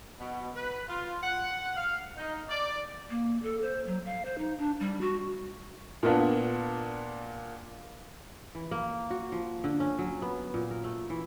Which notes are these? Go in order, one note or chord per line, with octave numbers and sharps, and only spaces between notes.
B2
B4
F4
F#5
F5
D#4
D5
A#3
A4
C5
F#3
F5
C5
D#4
D4
G3
F#4
A#2 A#3 B3 D4 F4
E3
A#3
F#4
F3
D3
C#4
F#3
B3
A#2
A#4
A3
E3